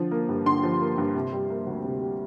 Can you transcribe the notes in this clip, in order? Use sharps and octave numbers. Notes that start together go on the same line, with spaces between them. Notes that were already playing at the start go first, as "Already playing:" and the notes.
Already playing: D3 F3
A#3
G2
D3 C6
F3
A#3
G2
C3
G3
A#3
D2
C3
G3